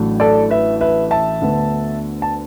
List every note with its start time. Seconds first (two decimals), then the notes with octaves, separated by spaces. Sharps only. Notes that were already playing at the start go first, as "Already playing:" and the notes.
Already playing: A1 A2 F#3 A3 D4
0.20 A4 D5
0.50 B4 E5
0.81 B4 E5
1.11 E5 A5
1.41 D2 D3 B3 D4
2.22 A5